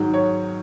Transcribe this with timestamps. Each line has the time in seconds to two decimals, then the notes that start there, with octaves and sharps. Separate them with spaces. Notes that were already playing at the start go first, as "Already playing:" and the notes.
Already playing: G#2 D#3 F#3
0.14 C#5